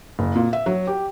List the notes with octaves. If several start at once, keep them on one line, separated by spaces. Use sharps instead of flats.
F#1
A#2
E5
F#3
G4